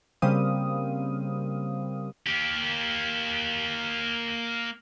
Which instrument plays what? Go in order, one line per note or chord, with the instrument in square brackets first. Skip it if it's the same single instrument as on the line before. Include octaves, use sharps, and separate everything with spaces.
[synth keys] C#3 G3 A#3 C4 F5 D#6
[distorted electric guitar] A#3 G4